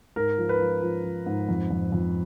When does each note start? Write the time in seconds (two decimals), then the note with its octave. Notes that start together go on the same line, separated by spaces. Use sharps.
0.16 G#2 A#4
0.38 F3
0.49 B4
0.60 F3
0.82 F3
1.04 F3
1.26 G#2
1.49 F2
1.71 F2
1.92 F2